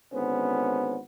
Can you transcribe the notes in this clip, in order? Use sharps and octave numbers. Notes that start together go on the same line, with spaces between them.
G#1 D3 B3 C#4 C5